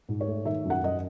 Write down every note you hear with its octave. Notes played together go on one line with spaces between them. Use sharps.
G#2
C#5
A3
D#3 E5
F#2
F#5
F#2 D#5